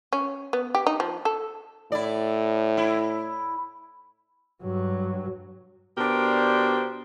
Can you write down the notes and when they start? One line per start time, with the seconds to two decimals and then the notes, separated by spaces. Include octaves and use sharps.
0.13 C#4
0.53 B3
0.75 G4
0.87 D#4
1.00 F3
1.25 A4
1.92 A2 E4 D5
2.77 E4
4.63 G2 F#3
5.98 B2 D4 G4 A#4 C5 D5